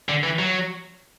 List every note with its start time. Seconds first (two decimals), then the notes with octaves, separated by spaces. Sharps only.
0.09 D3
0.23 E3
0.39 F#3